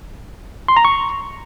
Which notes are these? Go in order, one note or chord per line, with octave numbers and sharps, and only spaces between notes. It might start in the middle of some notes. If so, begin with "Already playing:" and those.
C6
A#5
C#6